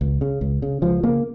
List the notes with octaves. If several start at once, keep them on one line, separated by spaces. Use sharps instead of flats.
C#2
C#3
C#2
C#3
C#2 F3
C#3 A#3